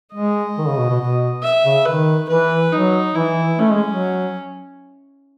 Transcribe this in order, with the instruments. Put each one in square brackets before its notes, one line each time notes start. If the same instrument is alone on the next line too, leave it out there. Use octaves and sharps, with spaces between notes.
[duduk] G#3 [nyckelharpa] D#5
[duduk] D#3
C#3
B2
B2
B2
[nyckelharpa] E5
[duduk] C#3
[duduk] D#3 [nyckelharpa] B4
[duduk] E3 [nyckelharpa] B4
[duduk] F#3 [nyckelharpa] D#4
[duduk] E3 [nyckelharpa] E4
[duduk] A3 [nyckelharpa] C#4
[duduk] G#3
F#3